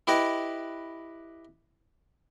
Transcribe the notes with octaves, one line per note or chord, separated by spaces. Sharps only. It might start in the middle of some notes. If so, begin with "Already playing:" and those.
E4 G4 B4 D#5